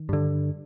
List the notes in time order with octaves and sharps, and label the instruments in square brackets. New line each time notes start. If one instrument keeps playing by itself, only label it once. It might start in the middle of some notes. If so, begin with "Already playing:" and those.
Already playing: [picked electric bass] D#3
G2 D3